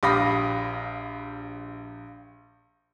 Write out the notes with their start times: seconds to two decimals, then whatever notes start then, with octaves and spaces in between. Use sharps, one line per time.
0.03 A#1 G4 F5 B5 D#6 A#6